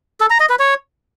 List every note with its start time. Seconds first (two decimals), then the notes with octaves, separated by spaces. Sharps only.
0.20 A4
0.30 A#5
0.40 D#5
0.50 B4
0.59 C#5